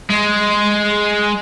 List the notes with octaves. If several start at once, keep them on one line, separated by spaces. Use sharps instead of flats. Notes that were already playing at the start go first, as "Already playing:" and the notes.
G#3